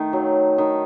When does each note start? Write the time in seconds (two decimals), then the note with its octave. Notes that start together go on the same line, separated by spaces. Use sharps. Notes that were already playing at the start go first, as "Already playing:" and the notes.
Already playing: D#3 A3
0.13 F#3
0.58 D#3